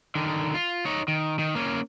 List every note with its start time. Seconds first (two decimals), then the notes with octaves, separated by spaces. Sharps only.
0.15 D3 D#3
0.54 F4
0.86 D#4 C#5
1.08 D#3
1.39 D#3
1.55 A#3 C#4